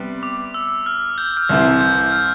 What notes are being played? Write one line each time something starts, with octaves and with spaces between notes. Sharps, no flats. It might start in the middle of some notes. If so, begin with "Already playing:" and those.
Already playing: C3 G3 B3
D6
E6
F6
G6
F6
C2 C3 E3 G6
G6
F6